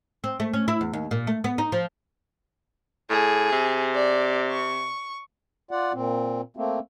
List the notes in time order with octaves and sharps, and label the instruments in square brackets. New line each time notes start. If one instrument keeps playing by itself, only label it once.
[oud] C4
A3
C#4
E4
E2
D#2
A#2
A3
B3
D#4
F3
[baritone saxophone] A2 [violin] G#4
[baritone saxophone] C3
[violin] D5
C#6
[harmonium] F4 D5 F#5
A#2 C4
A3 A#3 C4